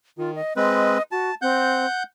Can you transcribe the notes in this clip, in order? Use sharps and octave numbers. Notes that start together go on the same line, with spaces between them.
D#3 F4
D#5
G#3 C4 B4 D#5
F#4 A5
C4 F#5 G6